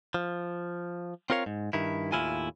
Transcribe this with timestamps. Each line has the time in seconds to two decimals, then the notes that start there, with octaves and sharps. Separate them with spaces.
0.14 F3
1.30 C4 F4 A#4 C#5 F5
1.46 G#2
1.73 G2 D#3 E4
2.12 D#2 A2 G#3 E4 F4 G#5